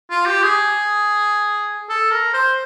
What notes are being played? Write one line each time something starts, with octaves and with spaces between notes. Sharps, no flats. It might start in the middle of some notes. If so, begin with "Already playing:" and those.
F4
G4
G#4
A4
A#4
C5